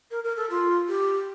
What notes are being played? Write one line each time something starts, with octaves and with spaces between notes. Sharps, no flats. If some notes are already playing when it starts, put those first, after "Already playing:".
A#4
A#4
A4
F4
G4